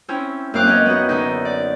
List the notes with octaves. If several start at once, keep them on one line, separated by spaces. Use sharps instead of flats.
C4 C#4 E4
F#2 A#3 C4 F5 D6 F#6
B3 C#4 C#5 D#5
B3 D#4 F#4
D3 D#4
D5